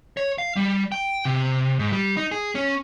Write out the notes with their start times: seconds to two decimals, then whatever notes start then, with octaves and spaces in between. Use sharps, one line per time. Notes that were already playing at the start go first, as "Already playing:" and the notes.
0.17 C#5
0.38 F5
0.56 G3
0.92 G5
1.25 C3
1.79 G#2
1.92 G3
2.17 D#4
2.31 G#4
2.55 C#4